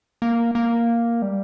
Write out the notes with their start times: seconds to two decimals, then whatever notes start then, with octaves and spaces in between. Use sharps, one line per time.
0.22 A#3
0.55 A#3
1.22 G3